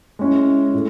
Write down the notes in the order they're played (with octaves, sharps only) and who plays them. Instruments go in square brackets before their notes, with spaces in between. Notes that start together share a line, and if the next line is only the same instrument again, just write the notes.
[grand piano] G#3 C#4 E4
A2